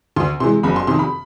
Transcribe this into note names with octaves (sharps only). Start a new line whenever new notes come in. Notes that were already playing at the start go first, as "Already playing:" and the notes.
D2 C6
C3 E3 G#3 C6
F#1 B5
C6
F2 C3 D#3 C6
B5